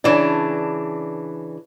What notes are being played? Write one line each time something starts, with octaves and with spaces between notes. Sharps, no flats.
C#3 E3 D4